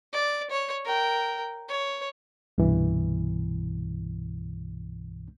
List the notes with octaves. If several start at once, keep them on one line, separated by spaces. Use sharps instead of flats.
D5
C#5
A#4 G5
C#5
C2 G2 B2 E3